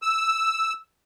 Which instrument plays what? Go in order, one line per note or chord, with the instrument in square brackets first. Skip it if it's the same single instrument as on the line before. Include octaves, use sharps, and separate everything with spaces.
[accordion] E6